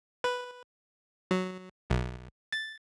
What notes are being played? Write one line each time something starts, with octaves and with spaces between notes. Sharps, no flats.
B4
F#3
B1
A6